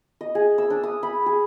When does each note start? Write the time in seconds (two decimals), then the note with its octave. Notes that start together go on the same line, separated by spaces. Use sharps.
0.21 D#5
0.35 G#4
0.58 E6
0.70 D4
0.83 D#6
1.03 B5
1.26 G#4